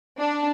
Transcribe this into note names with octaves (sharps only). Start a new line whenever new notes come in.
D4